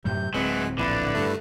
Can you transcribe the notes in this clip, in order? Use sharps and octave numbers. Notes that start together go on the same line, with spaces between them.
F#2 A2 C3 F#3 G6
D1 F#3 G#3 C4 E4 B4
A#1 D3 E4 B4 D5
G2 A3